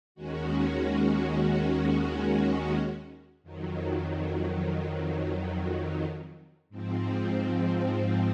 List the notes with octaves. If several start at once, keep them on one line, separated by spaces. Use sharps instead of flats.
D#2 D#3 G#3 C#4 F#4
F2 D#3 F#3
G#2 F3 C4